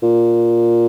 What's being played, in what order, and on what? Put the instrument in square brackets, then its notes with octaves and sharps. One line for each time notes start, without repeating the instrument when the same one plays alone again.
[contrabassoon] A#2